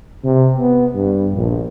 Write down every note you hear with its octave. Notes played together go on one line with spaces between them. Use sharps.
C3
B3
G2
A#1